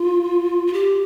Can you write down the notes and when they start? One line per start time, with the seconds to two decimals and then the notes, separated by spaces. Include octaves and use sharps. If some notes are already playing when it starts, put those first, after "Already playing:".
Already playing: F4
0.67 F4
0.73 G4